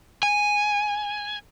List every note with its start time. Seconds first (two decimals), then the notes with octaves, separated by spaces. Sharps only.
0.23 G#5